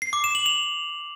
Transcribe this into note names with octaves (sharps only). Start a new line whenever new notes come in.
C7
D6
E7
F#7
F7